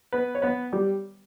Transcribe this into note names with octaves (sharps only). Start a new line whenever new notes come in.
B3 B4
C#5
B3 B4
G3 G4